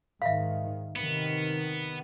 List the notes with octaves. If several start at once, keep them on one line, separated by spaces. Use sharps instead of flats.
G#2 D#3 E5 F5
C3 D#3 B3